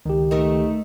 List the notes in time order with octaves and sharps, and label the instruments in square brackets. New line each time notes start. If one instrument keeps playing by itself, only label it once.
[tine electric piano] C#2 G4 [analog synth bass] D#3
[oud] A3 A#4 [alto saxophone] D#4